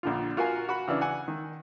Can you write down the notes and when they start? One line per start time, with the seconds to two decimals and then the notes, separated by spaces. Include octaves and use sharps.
0.03 A#1 D3 F4
0.37 F4 F#4 A#4 F5 G#5
0.69 F#4 F#5 B5
0.88 C#3 E3 D4 E6
1.01 F#5 G#5
1.28 D#3